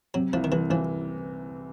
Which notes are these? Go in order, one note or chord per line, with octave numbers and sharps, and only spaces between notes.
C3 F#3
C2 F3
D#3
C2 E3
E3 F3